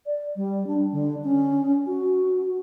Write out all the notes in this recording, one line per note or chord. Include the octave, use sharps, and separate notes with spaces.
D5
G3
D4
D3
C#4
F#4